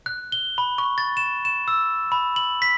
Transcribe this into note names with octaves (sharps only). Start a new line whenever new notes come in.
F#6
G7
B5
C#6
A6
E7
E7
E6
B5
F#7
B6